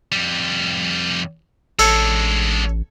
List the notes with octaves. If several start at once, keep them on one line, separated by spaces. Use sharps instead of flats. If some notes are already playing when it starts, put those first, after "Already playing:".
F2 G3
A1 G#3 D4 A4 C#5